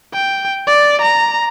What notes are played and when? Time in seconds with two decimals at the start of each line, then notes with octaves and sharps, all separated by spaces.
0.14 G5
0.67 D5
1.01 A#5